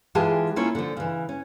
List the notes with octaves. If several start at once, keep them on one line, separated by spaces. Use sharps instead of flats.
E3 G#3 F4 G4 G#4 A5
A#3 C#4 E4 F4 C#5
D3 F3
C#3 E3
C#4